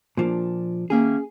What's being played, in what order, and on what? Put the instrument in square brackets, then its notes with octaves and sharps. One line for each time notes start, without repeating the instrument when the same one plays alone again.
[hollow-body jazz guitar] A#2 F3 D4
[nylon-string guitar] D#3 A#3 E5 [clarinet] C#4 [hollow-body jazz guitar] G#4